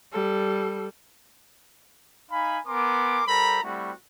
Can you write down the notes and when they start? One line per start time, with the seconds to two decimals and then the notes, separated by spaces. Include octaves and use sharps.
0.12 G3 A4
2.31 D#4 F5 G#5 B5
2.67 B3 A#4 G#5 C6 D6
3.27 G3 A4 A#4 C5 A#5 B5
3.63 G3 A3 C4 E4 F#4